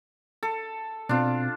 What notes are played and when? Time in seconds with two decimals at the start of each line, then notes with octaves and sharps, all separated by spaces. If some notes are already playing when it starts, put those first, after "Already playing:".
0.43 A4
1.09 B2 C4 D4 F4